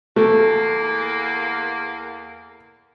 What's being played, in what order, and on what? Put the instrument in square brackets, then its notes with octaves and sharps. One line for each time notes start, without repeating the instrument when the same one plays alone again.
[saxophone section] E2 A#3 [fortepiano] A3